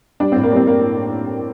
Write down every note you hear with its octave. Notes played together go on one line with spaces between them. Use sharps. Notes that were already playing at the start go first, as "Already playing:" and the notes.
G3 D4
A2 C4
A#3
G3 C4
G3 A#3